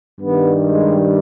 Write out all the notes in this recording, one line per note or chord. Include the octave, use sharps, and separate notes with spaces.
G2 D#3 G3 B3
G#3